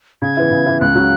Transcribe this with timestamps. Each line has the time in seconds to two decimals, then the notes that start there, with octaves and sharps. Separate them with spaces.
0.22 C#3 G#6
0.37 E3 B3 E4
0.51 C#3
0.66 E3 B3 E4
0.81 C#2 F#6
0.95 C#3 F#3 C#4